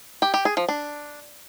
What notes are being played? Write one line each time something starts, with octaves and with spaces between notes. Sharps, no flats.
G4
G4
G#4
F3
D4